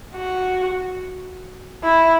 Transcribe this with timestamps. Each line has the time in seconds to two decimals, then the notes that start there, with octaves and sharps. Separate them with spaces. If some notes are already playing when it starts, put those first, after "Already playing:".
0.15 F#4
1.84 E4